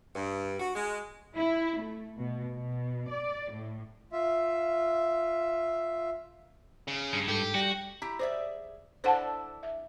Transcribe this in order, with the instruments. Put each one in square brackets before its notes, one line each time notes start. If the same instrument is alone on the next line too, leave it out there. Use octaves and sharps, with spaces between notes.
[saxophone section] G2
F#4
G#3
[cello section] E4
A3
B2
B2
D5
A2
[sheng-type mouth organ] F4 E5
[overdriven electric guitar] C#3
[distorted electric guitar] G2
[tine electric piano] G#2 A4 [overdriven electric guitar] G4
[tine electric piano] G3 G5 A#6 [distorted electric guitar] F#4
[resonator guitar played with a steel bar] E4 G4 A#5
[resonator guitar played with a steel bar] G#4 D5 E5 [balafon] C5
[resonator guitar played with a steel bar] D4 E4 A4 [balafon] C5 F#5 A5
[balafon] E5